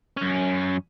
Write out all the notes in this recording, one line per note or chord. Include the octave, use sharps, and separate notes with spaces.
F#2 C#4